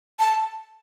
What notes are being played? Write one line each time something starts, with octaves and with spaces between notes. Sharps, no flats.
A5